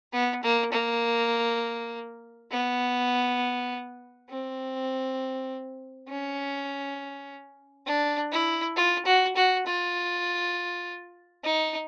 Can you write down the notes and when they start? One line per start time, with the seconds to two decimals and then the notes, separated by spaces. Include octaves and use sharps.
0.12 B3
0.43 A#3
0.72 A#3
2.50 B3
4.30 C4
6.08 C#4
7.86 D4
8.32 E4
8.76 F4
9.05 F#4
9.36 F#4
9.66 F4
11.44 D#4